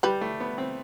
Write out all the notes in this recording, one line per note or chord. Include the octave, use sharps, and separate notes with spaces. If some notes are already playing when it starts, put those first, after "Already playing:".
G3 G4 B4
A3
B3
C4